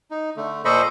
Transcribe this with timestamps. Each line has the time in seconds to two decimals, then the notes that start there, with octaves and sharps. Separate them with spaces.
0.11 D#4
0.37 D3 A3
0.65 A#2 A4 C5 D#5 B5 C#6